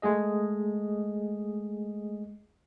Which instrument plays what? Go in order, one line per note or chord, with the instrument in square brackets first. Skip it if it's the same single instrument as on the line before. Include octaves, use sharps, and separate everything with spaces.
[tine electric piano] G#3 A3 G#4 D#5